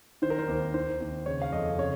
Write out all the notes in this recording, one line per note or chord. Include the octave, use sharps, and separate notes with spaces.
D#3 C5
A#4
C5
D#2
D#3 C5
D#2
C#3 C#5
F5
F2 D#5
C#3 C#5